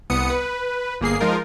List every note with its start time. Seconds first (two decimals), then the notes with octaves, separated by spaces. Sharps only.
0.10 C2 B3 D#6 C#7
0.30 B4
1.01 G1 A#3 G#4 C7
1.20 F3 G#3 D#4 F4 A#4